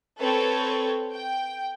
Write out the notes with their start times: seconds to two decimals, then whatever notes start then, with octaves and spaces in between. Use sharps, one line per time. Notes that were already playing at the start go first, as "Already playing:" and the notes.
0.20 C4 A4 B4 C#5
1.12 G5